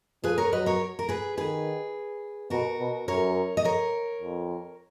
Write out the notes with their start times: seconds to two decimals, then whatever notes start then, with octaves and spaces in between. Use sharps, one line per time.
0.24 F3 G#4 B4
0.38 A#4 C#5
0.53 F#3 B4 D#5
0.66 A#4 C#5
0.99 A#4
1.09 G#4 B4
1.38 D#3 G#4 B4
2.50 B2 F#4 A#4
2.80 B2
3.08 F#2 A#4 C#5
3.57 D#5
3.65 A#4 C#5
4.21 F2